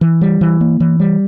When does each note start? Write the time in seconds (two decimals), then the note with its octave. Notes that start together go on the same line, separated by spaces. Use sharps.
0.01 E3
0.21 G3
0.41 E3
0.61 A#3
0.80 E3
1.00 G3